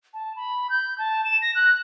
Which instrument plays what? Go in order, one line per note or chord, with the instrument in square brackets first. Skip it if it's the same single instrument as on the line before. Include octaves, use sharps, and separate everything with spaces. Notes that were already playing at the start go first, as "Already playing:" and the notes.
[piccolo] A5
B5
G6
A5
E7
A#6
F#6